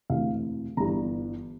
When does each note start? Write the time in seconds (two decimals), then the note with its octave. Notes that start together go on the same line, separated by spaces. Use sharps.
0.10 E1 D2 C3 E3 F5
0.77 G1 G2 E3 A#5